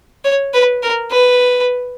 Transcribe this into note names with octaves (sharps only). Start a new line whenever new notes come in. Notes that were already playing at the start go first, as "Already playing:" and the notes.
C#5
B4
A#4
B4